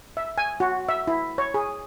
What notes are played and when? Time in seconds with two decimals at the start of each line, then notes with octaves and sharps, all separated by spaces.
0.17 E5
0.38 G#5
0.60 F#4
0.89 E5
1.07 E4
1.38 C#5
1.54 G#4